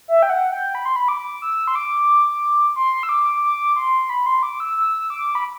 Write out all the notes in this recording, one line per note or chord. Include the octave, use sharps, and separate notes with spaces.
E5
G5
F#5
G5
B5
C6
B5
D6
E6
C6
D6
C6
E6
D6
D6
C6
B5
C6
D6
E6
E6
D6
B5